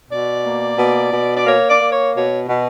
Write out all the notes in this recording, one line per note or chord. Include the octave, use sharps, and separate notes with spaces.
B2 D5
A#3
B2
B2
D5
A#3 C#5
D5
A#3
C#5
B2 C#5
B2